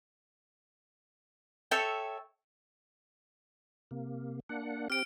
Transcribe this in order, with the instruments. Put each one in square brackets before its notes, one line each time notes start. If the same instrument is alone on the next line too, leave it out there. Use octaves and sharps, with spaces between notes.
[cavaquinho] A4 C#5 E5 G5
[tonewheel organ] C3 A#3
A#3 D4 F#5
[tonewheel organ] C4 G4 [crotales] F6 D7